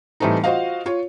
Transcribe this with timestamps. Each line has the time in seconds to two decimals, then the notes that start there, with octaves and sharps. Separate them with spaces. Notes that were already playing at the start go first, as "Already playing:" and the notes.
0.20 A2 E3 G3 A3 C4 D#4
0.44 F4 F#4 C5 D#5 F5
0.86 F4 C#5